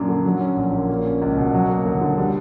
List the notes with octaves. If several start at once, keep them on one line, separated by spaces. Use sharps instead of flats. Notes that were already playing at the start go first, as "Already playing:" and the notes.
Already playing: F#2 A#2 A#3 D4
D3
F#3
C#4
A#1
A#2
A#3
C#4
C#2
B2
F#3
A#3
D2
D3
G3